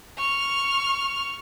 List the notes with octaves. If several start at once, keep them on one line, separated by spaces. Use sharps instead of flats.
C#6 F6